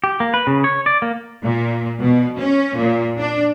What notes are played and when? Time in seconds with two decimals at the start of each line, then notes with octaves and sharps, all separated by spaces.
0.04 G4
0.20 A#3
0.34 B4
0.47 C#3
0.64 C#5
0.86 D5
1.02 A#3
1.43 A#2
2.02 B2
2.40 C#4
2.79 A#2
3.19 D4